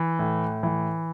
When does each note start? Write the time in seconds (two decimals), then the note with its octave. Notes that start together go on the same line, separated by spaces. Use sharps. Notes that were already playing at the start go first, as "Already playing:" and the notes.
Already playing: E3
0.19 A2
0.63 E3